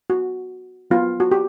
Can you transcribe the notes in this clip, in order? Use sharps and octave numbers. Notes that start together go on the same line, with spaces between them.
F#4
F#3 B3 F4
F#4
G4